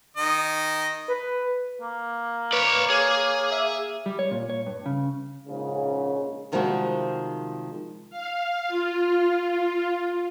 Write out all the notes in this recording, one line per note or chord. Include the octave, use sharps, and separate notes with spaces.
D#3 D#5
B4
A#3
B4 C#5 D5
G#4 C#5
E5
G3
C#5
A#2
C#5
G2
C#3
A#1 G#2 C#3
C3 D#3 F3 G3 G#3 F#4
F5
F4